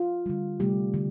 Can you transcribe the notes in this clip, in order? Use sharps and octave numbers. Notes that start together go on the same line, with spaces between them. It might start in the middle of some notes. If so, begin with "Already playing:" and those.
Already playing: F4
D3 G3
C3 G3 A3 G4
D3